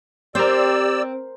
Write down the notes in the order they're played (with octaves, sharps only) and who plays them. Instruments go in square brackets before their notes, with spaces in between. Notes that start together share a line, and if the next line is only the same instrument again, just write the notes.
[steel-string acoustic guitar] C4 [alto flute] G4 [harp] A#4 C5 [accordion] D5 E6